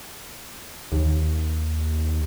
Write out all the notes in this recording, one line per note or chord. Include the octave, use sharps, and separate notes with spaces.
D#2